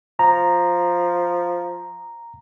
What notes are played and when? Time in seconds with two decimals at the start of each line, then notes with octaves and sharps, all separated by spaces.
0.19 F3 A#5